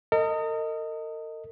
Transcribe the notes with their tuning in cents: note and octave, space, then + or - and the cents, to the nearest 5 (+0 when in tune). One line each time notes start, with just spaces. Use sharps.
A#4 -45 D#5 +0